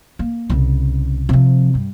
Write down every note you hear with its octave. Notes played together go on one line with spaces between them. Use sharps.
A#3
C2 C#3
C3 F3
G2